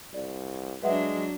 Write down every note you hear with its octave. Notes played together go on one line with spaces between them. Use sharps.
C2 D5
F#3 G#3 D4 B4 E5 F#5